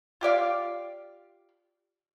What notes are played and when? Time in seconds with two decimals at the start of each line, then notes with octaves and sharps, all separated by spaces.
0.21 F4 G4 D5 F5